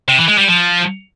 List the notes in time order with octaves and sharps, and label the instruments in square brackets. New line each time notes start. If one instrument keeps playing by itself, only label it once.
[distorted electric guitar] C3
E3
G#3
G3
F3